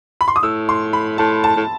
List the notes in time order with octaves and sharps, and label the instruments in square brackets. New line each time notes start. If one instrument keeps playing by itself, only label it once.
[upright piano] B5
C6
D#6
[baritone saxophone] A2 [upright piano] E6
[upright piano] C6
B5
[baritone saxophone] A2 [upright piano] A5
[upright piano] A5
[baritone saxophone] A2